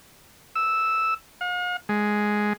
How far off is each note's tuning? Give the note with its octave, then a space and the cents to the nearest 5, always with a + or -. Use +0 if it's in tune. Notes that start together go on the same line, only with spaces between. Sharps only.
E6 -5
F5 +45
G#3 +5